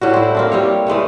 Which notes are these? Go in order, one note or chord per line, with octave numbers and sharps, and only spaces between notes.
A2 G3 F#4
E4 C5
A#3 C4 D4
G3 C4 C#5
E3 G#3 A3 C#5